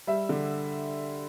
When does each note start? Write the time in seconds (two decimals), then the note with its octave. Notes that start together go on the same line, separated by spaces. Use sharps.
0.07 G3 E5
0.29 D3